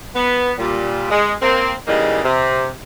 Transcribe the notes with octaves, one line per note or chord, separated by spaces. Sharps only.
B3
A#2 G3
G#3
A#3 C4
C#3 E3 G3 G#3 A#3 D#4
C3